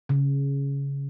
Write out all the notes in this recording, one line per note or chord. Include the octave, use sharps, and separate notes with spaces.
C#3